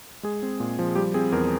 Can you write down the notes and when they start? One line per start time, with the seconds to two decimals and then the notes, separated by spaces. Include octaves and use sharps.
0.23 G#3 G#4
0.43 C4
0.60 A#2
0.79 F3
0.96 G3 G4
1.14 C4 G#4
1.32 E2 A#4